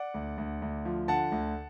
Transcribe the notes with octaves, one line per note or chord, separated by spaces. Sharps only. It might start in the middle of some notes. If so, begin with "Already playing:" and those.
Already playing: D5 F#5
D2
D2
D2
F3
D3 F#5 A5
D2